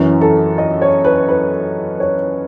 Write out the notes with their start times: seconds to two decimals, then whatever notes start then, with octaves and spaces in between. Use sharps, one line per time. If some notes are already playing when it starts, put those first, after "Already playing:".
Already playing: F#2 E3 C#4
0.21 A4
0.58 D#5
0.82 C#5
1.04 B4
1.29 B4
2.00 C#5